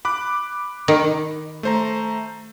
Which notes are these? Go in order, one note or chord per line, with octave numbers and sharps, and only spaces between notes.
B5 D6 F#6
D#3
A3 C5 A#5